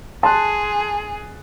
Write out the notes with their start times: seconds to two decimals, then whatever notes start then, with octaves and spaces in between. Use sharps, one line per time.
0.23 G#4 A5 C6 F#6